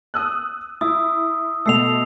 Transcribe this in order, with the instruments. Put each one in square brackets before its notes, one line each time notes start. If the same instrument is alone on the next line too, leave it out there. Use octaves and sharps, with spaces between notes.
[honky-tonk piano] D#6 E6 F#6
[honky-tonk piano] E4 [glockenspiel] D#6 E6
[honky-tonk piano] B2 A3 [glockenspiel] E6 C7 F7